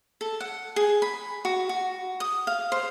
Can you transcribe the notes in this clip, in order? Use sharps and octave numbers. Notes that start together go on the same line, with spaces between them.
A4
F#5
G#4
B5
F#4
F#4
D#6
F5
C5